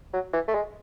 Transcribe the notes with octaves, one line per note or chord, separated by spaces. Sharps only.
F#3
E3
A3
G#3